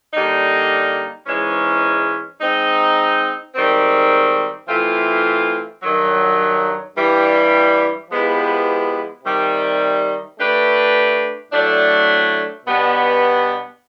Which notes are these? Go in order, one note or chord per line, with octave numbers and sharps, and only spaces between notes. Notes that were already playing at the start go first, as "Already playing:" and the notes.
D3 G3 A#3 D#4
G#2 E3 G#3 C#4
G#3 C4 D#4
G#2 D#3 G3 C4
E3 A3 C4 F4
G2 D#3 F#3
G2 E3 G3
F3 G#3 B3 E4 G4
C3 D#3 G3
A3 D4 G4 B4
A2 F#3 A3 D4
B2 G3 B3 D4